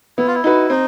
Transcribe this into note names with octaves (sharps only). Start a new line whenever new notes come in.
B3 E4
F4
E4
D#4 F#4 B4
C4 D#4